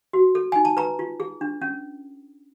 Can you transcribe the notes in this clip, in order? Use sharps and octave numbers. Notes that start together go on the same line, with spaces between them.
F#4
A4
D#4 G#5
A5
B4 A#5
F4
G#4
D4
C#4